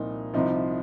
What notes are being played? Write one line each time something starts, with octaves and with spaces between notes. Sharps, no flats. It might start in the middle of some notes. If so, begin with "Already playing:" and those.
Already playing: C2 A#2 F3 D#4
C2 C3 F3 D#4